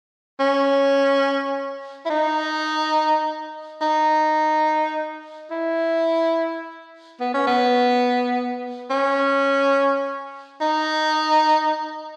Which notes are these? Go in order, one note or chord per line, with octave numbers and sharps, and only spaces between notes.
C#4
E4
D#4
D#4
E4
B3
C#4
B3
C#4
D#4